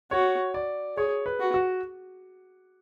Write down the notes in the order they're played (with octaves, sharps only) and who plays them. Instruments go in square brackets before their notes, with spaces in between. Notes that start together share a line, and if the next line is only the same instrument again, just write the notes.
[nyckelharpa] F#4 [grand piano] C#5
[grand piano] D5
[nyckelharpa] G#4 [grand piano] C#5
[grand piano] B4
[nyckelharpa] F#4
[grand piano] F#4